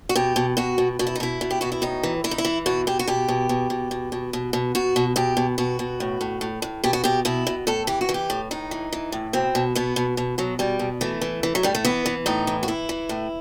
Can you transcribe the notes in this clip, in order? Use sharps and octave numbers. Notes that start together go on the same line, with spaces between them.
F#4
B2 G4
B2
B2 F#4
B2
B2 F#4
E4
D#4
B2 E4
B2
G4
B2 F#4
E4
A2 D#4
E3
E3 E4
D#4
E4
E3
B2 F#4
B2 G4
F#4
B2 G4
B2
B2
B2
B2
B2
B2
B2
B2 F#4
B2
B2 G4
B2
B2 F#4
B2
A2
A2
A2
A2
B2 G4
F#4
B2 G4
B2 E4
B2
A2 A4
E3 G4
F#4
E3
G4
A2
A2 D#4
E3
E3
A2
B2 C4
B2
B2 B3
B2
B2
B2 F#3
B2 G3
B2
E3 A3
E3
E3
F#3
A2 G3
A3
E3 B3
E3
A2 D#4
E3
F#4
E3 E4
E3
A2